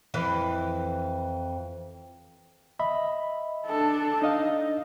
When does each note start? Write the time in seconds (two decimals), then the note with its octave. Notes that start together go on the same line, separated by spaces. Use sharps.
0.14 F2 E3 B4
2.79 D#5 E5 B5
3.66 D4 A4
4.22 D4 D#4 D#5 F5